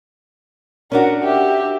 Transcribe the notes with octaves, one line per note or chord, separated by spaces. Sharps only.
C#4 D4 F#4 A#4
G4 E5